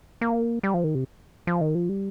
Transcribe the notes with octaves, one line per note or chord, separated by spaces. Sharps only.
A#3
G3
F3
D#3
C3
F3
D#3
F3
G3